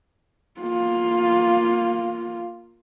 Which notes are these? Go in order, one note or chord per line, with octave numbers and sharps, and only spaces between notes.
A#3 F4